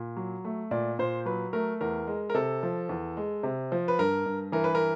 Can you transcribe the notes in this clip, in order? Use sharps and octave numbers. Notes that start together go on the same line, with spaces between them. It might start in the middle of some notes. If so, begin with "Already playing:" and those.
Already playing: A#2
F#3
A3
A#2 D5
A#2 C5
F#3 B4
A3 A#4
E2 A#4
G#3
A#4
C3 A4
F3
E2
G#3
C3
F3
B4
G2 A#4
G2
E3 A#4
B4
A#4